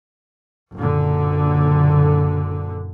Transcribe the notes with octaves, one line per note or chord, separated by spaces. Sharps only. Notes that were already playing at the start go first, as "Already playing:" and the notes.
F#1 A#2 D3